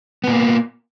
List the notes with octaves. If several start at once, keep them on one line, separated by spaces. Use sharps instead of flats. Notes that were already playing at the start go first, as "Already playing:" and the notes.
A#2 A#3 B3